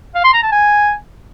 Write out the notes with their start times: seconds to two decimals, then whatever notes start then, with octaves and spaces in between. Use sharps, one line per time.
0.15 F5
0.24 C6
0.33 A#5
0.43 A5
0.52 G#5